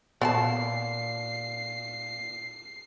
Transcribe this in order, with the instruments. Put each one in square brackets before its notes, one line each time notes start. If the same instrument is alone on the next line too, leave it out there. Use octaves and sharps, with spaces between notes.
[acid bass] A#2 [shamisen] B3 G5 A5 [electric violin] C7